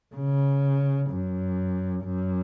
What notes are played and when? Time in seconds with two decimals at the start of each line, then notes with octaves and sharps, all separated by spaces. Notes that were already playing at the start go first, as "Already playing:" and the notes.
0.15 C#3
1.10 F#2
2.04 F#2